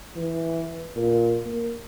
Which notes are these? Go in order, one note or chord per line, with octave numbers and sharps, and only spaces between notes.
E3
A#2
A#3